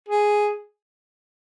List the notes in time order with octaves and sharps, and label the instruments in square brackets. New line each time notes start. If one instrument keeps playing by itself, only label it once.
[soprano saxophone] G#4